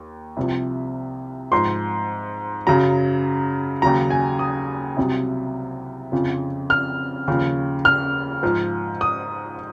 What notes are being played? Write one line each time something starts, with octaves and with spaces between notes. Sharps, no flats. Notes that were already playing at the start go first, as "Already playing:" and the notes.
Already playing: D#2
C2 C3 F3
G#2 F3 C6
F#2 C#3 F#3 A#5
D#2 C#3 F#3 A#5
G#5
D#6
C2 C3 F#3
F2 C#3 F3
F6
D#2 C#3 F3
F6
G#2 F3
D#6